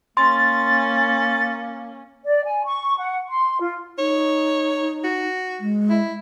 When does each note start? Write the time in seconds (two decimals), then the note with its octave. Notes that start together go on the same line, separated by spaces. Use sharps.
0.17 A#3 C#4 C6 A6
2.25 D5
2.45 G#5
2.65 C#6
2.98 F#5
3.29 C6
3.61 F4
3.98 D#4 C#5
5.04 F#4
5.60 G#3
5.90 E4